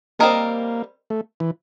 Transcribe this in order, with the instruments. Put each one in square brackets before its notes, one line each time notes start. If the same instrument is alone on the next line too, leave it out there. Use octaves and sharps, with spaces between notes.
[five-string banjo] G3 C4 F4 A#4 D#5 [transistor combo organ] A#3
[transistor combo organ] A3
E3